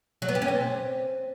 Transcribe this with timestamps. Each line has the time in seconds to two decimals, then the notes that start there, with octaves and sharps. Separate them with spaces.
0.22 F#3
0.29 B3
0.35 G4
0.42 C#4
0.48 C4